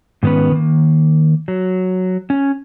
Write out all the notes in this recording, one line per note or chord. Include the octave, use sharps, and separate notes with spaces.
G#2 D#3 B3 C#4 B4
D#3 A#3
F#3
C#4